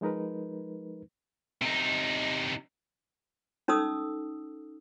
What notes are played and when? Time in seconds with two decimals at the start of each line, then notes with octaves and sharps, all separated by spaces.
0.01 F3 G#3 D#4 A#4 B4
1.62 C3 D#4
3.68 C#4 D#4 A4 D#6 E6